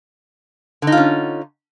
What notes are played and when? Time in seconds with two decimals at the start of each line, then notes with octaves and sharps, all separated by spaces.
0.82 D3
0.87 D#4
0.92 F4
0.97 C#4